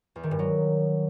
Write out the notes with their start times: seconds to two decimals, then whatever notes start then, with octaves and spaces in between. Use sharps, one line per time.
0.16 E2
0.23 D#3
0.31 G2
0.39 F#3